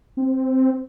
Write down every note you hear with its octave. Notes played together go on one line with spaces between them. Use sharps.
C4